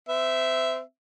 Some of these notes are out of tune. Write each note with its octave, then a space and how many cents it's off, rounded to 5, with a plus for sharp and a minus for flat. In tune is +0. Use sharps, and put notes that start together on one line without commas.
C4 -30 E5 +0